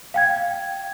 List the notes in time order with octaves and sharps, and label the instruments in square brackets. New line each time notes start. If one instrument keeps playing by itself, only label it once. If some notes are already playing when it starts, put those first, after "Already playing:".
[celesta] F5 G5 G#6